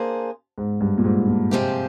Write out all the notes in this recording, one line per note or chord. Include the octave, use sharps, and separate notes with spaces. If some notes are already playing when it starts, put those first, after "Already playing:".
Already playing: A#3 D4 G#4 C5
G#2
G2
A#2
G#2
A#2
C3 F3 G#3 C4 G4